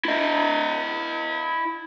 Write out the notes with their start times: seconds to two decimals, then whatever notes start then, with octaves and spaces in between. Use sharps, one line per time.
0.05 E4 D#5